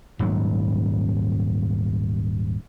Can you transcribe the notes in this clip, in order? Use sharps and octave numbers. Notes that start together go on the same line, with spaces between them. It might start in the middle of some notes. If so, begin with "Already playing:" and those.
D#1 G#2 F#3